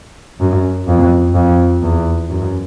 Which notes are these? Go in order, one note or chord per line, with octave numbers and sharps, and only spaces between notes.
F#2
F2
F2
E2
F#2